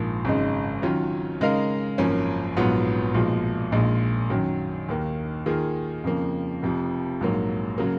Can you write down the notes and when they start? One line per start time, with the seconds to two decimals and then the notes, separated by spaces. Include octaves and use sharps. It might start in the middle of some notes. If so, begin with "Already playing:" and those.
Already playing: A#1 G#2 F3 A#3
0.25 G#1 F#2 C#3 G#3 D#4
0.82 D#3 F#3 C#4 F4
1.41 C#3 G#3 D#4 A#4 F5
1.98 G#1 F#2 F3 A#3 C#4
2.57 A#1 G#2 F#3 B3 F4
3.14 B1 A#2 F3 G#3
3.72 A#1 A#2 G#3 D#4
4.30 F#2 D#3 F#3
4.88 D#2 D#3 A#3
5.46 D#3 A#3 F4 G#4
6.04 F2 C#3 F3 A#3
6.62 F1 F2 F3
7.21 A#1 G#2 F#3 A#3
7.78 C#3 F#3 A#3